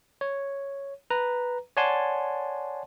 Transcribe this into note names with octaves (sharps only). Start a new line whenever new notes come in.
C#5
B4 A#5
C#5 D5 F#5 G#5 A5 C6